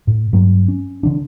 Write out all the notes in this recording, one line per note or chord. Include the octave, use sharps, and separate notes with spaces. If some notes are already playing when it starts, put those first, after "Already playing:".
A2
G2 F#3 A#3
C#4
C#3 E3 D4